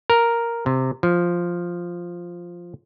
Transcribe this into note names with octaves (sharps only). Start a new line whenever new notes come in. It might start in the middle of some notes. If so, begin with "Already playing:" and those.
A#4
C3
F3